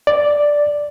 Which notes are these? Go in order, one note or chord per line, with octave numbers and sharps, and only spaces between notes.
D5